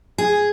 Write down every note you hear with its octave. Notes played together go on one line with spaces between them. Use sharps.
G#4